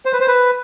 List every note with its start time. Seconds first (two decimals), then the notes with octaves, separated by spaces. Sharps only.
0.06 C5
0.13 B4
0.20 C5
0.28 B4